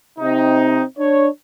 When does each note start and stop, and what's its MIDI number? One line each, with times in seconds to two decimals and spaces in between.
0.19 0.81 48
0.19 0.81 60
0.19 0.81 63
0.99 1.28 62
0.99 1.28 73